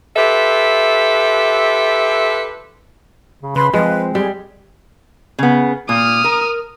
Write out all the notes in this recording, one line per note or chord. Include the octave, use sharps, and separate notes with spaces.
F4 G4 A4 B4 E5
C#3
C#3 B4 C6
F3 G#3 C4 B4
G3 G#4
C#3 B3
A#2 D#6 F6
A#4